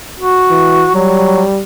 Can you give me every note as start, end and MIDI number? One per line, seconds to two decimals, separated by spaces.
0.20 0.93 66
0.51 0.88 52
0.95 1.42 54
0.95 1.62 55